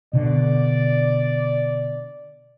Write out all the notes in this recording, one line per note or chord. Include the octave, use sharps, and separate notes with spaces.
B2 D3 D5